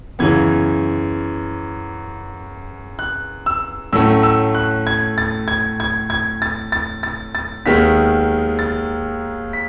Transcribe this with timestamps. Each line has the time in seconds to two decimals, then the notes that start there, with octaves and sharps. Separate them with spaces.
0.19 F#2 C#3 E3 B3 G#6
2.99 F#6
3.46 E6
3.93 A2 F#3 A3 C#4 E6
4.23 E6
4.55 F#6
4.87 G#6
5.18 A6
5.48 G#6
5.80 G#6
6.10 G#6
6.42 A6
6.72 A6
7.03 A6
7.35 A6
7.66 D#2 D#3 G#3 B3 B6
8.59 A6
9.53 B6